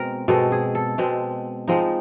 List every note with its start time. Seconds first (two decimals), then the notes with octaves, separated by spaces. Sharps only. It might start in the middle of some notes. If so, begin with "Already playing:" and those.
Already playing: B2 G#3 C4 A#4
0.28 B2 G#3 C4 A4
0.52 G#4
0.75 A4
0.98 B2 G#3 C4
1.68 F3 G#3 C4 D#4